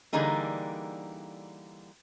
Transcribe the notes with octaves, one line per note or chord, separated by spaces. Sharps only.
D3 E3 G3 A#3 D#4 G#4